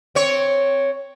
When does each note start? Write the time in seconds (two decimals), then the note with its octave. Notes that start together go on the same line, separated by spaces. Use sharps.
0.15 C4 C#5